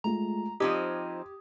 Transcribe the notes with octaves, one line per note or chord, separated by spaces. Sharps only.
G#3 A3 F4 A#5
F3 C4 D#4 G4 D#6 G#6